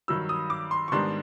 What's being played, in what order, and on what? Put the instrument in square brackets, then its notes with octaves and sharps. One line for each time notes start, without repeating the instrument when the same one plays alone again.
[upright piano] G2 D#3 F#3 E6
D#6
D6
C6
C#6
G#2 D#3 G3 B3 D4 C6